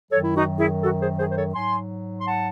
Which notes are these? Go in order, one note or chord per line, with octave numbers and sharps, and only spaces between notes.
F#2 D#3 F#3 A4 C#5
E4
D#4 F#4
E4 G#4
F#4 A4
G#4 C5
G#4 C5
C5
A4 C#5
G#2 F#3 G#5 C6
C6
F#5 A5